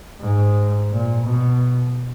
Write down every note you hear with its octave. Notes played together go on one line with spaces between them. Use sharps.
G#2
A#2
B2